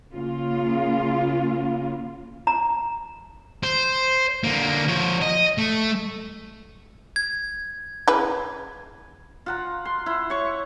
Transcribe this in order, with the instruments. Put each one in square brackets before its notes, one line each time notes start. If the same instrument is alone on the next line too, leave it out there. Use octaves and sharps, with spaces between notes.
[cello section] C#3 A#3 F4
[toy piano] A#5
[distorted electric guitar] C5
D3 A#3
F3 C#5
D#5
A3
[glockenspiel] G#6
[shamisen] C#3 E4 B4
[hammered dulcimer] F4 F#5 A#5
C6
E4
C#5 C#6